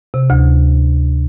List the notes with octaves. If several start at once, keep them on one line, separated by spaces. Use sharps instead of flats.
C3
D2